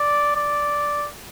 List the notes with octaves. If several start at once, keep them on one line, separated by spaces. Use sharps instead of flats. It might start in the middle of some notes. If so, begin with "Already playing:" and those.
Already playing: D5
D5